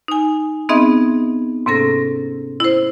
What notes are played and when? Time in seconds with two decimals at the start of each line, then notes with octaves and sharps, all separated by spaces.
0.08 D#4 G#5
0.69 B3 C4 D#4 G#4 D#5 E5
1.66 G#2 C3 A#3 C#4 A4 A#6
2.60 E4 C5